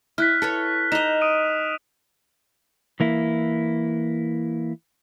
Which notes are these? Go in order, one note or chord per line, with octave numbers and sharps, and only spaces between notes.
E4 F6 F#6 B6
A4 B4 C#5
D#4 D#5 E7 F7
D#6 D7 D#7
E3 A#3 E4